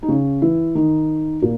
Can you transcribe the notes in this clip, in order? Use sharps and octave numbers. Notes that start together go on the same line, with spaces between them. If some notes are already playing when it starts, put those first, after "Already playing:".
D#4
C#3 C#4
E3 E4
D#3 D#4
A#2 A#3